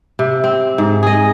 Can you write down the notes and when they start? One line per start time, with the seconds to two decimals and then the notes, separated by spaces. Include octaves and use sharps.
0.19 C3
0.44 C4
0.78 G#2
1.03 G#4 D#5